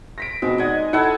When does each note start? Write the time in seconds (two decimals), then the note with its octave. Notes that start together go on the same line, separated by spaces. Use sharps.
0.18 A#6 B6 D7
0.42 B2 G#3 C4 F#4
0.58 D#4 D5 D#5 F#5 G#5
0.93 E4 A4 F#5 G#5 A5 E6